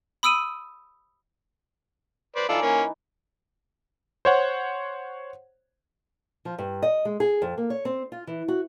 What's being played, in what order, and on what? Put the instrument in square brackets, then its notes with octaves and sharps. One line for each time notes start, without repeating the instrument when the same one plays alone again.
[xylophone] B5 D#6 E6 D7 D#7
[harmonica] B4 C5 D5
[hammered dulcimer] E3 D#4 [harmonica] F4 A4 D5
[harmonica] A#3 C#4
[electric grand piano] C5 C#5 F#5
[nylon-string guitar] F3
G2
D#5
G#3
G#4
F2
A#3
C#5
C4
F4
E3
F#4